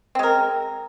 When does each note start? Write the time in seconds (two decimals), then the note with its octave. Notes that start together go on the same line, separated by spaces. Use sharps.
0.15 C4
0.19 G#3
0.23 A#4